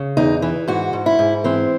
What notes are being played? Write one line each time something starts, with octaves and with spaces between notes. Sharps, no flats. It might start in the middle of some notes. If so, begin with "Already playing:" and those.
Already playing: C#3
E2 D#4
E3
G#2 F#4
G#2
E4
G#2
E3 C4